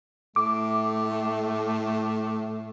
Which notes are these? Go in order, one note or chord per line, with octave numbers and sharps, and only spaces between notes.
A2 A3 D6